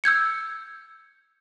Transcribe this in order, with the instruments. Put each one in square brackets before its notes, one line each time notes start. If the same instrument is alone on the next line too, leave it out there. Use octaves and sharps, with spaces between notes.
[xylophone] E6 G6 G#6 C#7